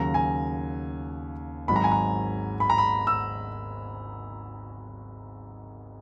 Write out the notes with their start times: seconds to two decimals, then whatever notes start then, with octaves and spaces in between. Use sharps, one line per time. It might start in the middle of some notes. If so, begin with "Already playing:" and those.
Already playing: D#2 C#3 F#3 A#5
0.14 G#5
1.68 G#1 G#2 F#3 B5
1.76 A#5
1.84 G#5
1.92 A#5
2.60 B5
2.70 A#5
2.78 B5
3.07 E6